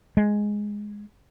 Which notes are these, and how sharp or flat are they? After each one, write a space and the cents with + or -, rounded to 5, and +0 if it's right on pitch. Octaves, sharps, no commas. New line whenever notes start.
G#3 +0